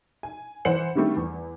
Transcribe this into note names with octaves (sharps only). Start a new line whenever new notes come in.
G#5
E3 C5 F#5 C#7 F#7
D3 D#3 G3 A3 C4
E2